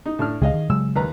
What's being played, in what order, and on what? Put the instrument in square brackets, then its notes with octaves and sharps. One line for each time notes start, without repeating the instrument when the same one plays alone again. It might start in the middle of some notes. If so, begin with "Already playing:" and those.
[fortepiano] D#4
A2 D4 F6
[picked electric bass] C#2 C#3 G#3 [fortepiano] G#4 D#5 F5
[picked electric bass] D#3
[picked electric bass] C#3 F#3 G#3 [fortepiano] E6
[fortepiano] D#2 B4 A#5